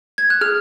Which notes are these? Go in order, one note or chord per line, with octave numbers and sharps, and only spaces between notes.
G#6
F#6
G#4 F6